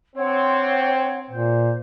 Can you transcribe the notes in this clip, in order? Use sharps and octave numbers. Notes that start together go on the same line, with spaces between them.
C4 D4 C#5 F#5
A#2 C5